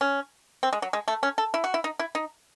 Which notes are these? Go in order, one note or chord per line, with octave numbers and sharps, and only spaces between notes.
C#4
C4
G#3
F#3
G#3
A3
C#4
A4
E4
F#4
E4
D#4
E4
D#4